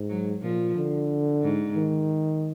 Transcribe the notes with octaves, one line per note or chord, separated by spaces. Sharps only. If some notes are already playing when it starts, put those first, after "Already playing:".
Already playing: G#2
F#3
A#2 F3
D3
G#2
D#3